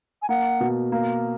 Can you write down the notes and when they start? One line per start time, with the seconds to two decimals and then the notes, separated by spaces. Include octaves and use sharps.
0.22 G#5
0.29 A#3 F#5
0.60 B2
0.92 A#3